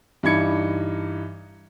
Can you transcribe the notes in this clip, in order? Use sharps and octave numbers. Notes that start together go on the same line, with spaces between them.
G2 E3 D#4 G#6 C#7